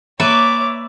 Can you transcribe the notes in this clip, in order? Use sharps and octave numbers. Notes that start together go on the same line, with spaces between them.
A#3 B4 C#5 D5 E5 D6